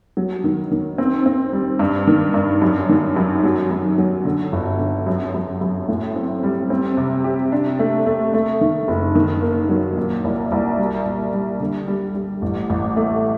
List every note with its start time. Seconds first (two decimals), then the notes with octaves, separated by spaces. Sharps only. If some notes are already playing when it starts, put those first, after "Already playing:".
0.17 F#3
0.44 D#3
0.71 D#3
0.98 C4
1.26 C4
1.53 G3
1.79 G2
2.07 D#3
2.34 G2
2.62 F#2
2.89 D#3
3.16 F#2
3.44 F#3
3.71 F#2
3.98 F#3
4.25 D3
4.52 G1
4.79 D3
5.06 F#2
5.34 F#2
5.61 F#2
5.88 A2
6.16 C4
6.43 G3
6.70 C4
6.97 C3
7.24 G4
7.52 D4
7.79 A3
8.06 A3
8.34 A3
8.61 D#3
8.88 F#1
9.15 D#3
9.42 A#3
9.69 F#3
9.97 A#2
10.24 C2
10.52 C2
10.79 G3
11.06 A#2
11.33 G3
11.60 D3
11.88 G3
12.15 G3
12.42 A1
12.70 A1
12.96 A3